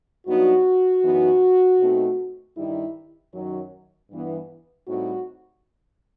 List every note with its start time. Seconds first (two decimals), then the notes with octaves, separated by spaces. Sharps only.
0.27 G2 F#3 B3 D#4 F#4
1.03 F#2 E3 B3 D#4
1.80 B2 A3 C4 D#4
2.57 G2 D#3 G3 D#4 E4
3.34 F#2 D#3 F#3
4.11 G2 E3 B3
4.87 A2 G3 C4 D#4 F#4